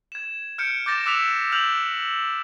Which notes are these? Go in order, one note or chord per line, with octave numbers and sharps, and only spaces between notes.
G#6 E7
F6 G6 C#7 D7
D6 G6 A6 A#6 E7
D6 E6 F#6 B6 F7
F6 G6 F7 F#7